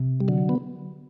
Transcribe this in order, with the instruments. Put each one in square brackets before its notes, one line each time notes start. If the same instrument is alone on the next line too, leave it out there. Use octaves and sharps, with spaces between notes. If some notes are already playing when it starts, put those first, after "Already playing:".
Already playing: [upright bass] C3
[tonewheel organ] G3
D3 F#3
B3